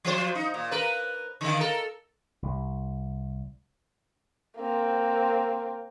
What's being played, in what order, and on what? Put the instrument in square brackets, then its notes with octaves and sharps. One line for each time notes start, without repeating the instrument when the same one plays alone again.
[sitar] F3 C5
D#4
A#2
A#4 B4
D3 D#3
A4 A#4
[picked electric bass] C2
[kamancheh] A#3 C4